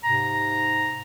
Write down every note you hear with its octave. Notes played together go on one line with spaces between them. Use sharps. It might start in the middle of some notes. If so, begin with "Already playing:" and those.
G#2 C3 A#5